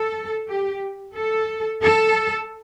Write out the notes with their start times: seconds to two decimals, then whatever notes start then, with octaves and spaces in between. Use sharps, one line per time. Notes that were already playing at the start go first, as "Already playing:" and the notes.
Already playing: A4
0.48 G4
1.16 A4
1.83 A4